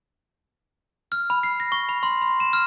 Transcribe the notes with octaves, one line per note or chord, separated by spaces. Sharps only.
F6
B5
C7
A#6
C#6
B5
C6
B5
E7
F6